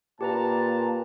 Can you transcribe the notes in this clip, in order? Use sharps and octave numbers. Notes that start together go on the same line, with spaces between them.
A#2 G4 B4 A5 A#5